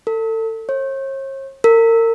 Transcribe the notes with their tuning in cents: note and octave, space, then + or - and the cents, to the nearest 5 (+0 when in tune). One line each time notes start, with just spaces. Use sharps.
A4 +30
C#5 -45
A#4 -35